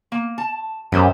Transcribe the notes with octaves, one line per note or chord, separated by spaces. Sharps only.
A#3
A5
F#2 B3 G4 C5